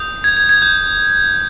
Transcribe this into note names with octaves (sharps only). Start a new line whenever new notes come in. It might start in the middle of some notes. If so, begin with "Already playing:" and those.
Already playing: D#6 G6
G#6
G#6
G#6
G6